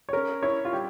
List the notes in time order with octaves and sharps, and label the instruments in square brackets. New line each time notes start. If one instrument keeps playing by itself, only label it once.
[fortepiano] C#5
[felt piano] C#4 [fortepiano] A#4
[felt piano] E4 [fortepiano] C#5
[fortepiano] F4
[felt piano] G3 [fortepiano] G4